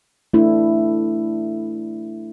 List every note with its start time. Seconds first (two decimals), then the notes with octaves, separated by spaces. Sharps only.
0.34 A3 D4 E4